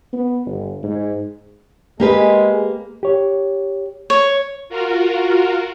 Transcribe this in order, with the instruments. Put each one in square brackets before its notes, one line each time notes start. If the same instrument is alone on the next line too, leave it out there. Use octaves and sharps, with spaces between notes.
[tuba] B3
G1
G#2
[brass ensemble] G#3 [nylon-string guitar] A#3 G4 B4
[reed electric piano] G4 C#5
[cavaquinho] C#5
[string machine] F4 F#4 A#4